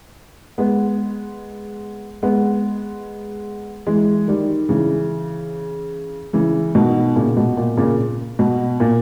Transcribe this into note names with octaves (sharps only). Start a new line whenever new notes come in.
G#3 B3
G#3 B3
E3 G#3
D#3 G3
C#3 E3
C#3 E3
B2 D#3
A#2 C#3
B2
A#2
A#2 C#3
B2
A#2